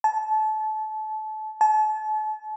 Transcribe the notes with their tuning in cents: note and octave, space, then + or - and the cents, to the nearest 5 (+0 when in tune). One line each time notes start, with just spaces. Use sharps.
A5 -25
A5 -35